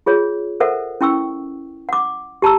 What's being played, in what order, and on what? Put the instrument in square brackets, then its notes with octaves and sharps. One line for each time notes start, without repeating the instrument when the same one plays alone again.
[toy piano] F4 G#4 C#5
A4 A#4 C5 E5 F#5
C#4 E4 G5 C#6 E6
F#5 D6
G4 A5 A#5 E6